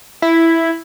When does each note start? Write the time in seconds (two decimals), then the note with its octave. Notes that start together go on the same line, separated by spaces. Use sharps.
0.22 E4